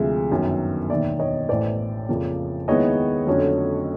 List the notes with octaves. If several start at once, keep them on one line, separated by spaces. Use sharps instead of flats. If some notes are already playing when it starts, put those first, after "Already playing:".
Already playing: D2 C3 F3 G#3 E5
G1 F#2 D#3
E1 D#2 D#3 D5 E5
C#5 D#5
A1 A2 E3 C5 D5
F2 C#3 F3 A#3
D#2 D#3 G#3 B3 E4 C#5 D#5
F2 D3 F#3 A3 C#4